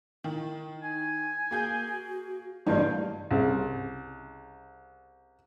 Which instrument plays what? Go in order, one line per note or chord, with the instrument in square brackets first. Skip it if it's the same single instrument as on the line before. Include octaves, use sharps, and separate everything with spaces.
[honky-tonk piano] D#3 [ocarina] E4
[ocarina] D#4 [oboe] G#5
[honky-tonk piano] A#3 G#4 G6 [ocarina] F#4
[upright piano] A1 G2 [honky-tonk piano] C#3 A#3 C#4 [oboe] C5
[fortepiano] C2 C#3